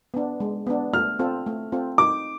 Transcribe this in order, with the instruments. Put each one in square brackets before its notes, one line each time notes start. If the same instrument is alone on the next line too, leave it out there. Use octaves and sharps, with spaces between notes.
[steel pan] B3 D4
G#3
B3 D4
[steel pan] A3 [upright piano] F6
[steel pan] C4 F4 A4
A3
C4 F4 A4
[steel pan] D#4 [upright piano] D6